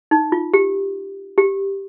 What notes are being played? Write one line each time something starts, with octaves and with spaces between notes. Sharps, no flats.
D#4
F4
G4
G4